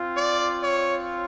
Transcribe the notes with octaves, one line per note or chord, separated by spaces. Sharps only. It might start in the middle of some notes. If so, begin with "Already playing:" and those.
Already playing: C4 F4
D5
C#5